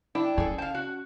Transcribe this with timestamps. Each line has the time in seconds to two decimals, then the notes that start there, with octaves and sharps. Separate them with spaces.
0.15 D4 E4 G5
0.38 C#4 G#4 A4
0.58 F5 G5 A5
0.74 F#4